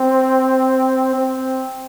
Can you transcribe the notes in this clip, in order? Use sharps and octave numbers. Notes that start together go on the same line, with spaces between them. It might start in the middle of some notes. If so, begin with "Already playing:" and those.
Already playing: C4
C4